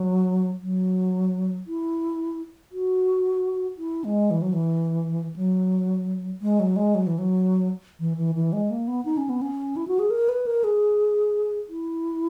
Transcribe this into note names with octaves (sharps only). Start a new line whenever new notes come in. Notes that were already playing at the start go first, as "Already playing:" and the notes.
Already playing: F#3
F#3
E4
F#4
E4
G#3
E3
F#3
E3
F#3
G#3
F#3
G#3
F#3
E3
F#3
E3
E3
E3
G#3
A#3
B3
D#4
C#4
B3
C#4
E4
F#4
G#4
A#4
B4
A#4
G#4
E4